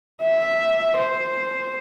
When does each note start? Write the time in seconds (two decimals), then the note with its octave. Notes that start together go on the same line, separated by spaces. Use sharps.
0.22 E5
0.97 C5